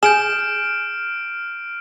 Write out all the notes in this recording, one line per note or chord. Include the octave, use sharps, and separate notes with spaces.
G#4 F6 G6 D7 E7